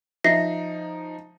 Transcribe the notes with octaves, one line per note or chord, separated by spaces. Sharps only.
F3 D#4 E5 A#6 C7